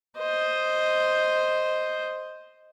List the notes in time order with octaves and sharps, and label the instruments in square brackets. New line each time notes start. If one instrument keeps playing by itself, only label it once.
[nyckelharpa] C5 D#5